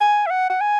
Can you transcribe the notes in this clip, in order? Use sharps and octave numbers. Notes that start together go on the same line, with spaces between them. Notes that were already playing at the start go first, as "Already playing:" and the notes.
G#5
E5
F#5
F#5
G#5